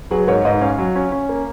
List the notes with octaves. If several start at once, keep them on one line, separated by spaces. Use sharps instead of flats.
F#3 G#4 B4
G#2 A#4 C#5
G#2 B4 D#5
C#4 C#5 F5
F#3
C#4
C#4
A#3